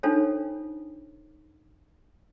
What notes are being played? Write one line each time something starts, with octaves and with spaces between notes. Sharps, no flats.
D4 D#4 F4 A4 C5 C#5